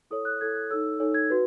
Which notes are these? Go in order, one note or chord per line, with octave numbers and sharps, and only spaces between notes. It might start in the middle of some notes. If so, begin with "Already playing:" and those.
E4 A4 C#5 D#6
F#6
E4 A4 C#5 G#6
F#6
D#4 A4 C#5 E6
D#4 A4 C#5
G#6
F#4 B4